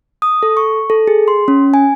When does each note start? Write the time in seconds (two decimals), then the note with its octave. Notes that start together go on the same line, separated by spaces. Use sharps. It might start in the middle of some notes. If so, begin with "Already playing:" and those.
0.22 D#6
0.43 A4
0.57 C#6
0.90 A4
1.08 G#4
1.28 C6
1.48 C#4
1.74 G#5